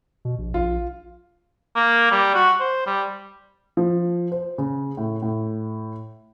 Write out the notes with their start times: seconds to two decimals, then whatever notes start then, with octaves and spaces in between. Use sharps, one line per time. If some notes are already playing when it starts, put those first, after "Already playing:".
0.25 B2
0.38 A#1
0.54 A#1 F4
1.76 A#3
2.11 G3
2.34 F#4
2.60 C5
2.86 G3
3.77 F3
4.32 C5
4.58 C#3
4.97 A2
5.22 A2